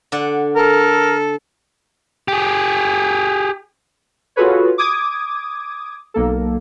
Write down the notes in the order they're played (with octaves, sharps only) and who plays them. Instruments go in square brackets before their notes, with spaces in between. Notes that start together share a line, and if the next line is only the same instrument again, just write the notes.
[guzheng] D3 D5 F#5
[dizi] A4 [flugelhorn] A#4
[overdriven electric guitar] G4 G#4
[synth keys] F4 F#4 G#4 A4 B4 C#5
D6 D#6 G#6
B1 A#3 A4